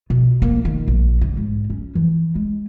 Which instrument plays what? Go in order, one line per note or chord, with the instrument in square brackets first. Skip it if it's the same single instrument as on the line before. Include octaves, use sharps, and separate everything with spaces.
[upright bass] B2
A#3
D#3
A#1
D3
G#2
C#4
E3
G#3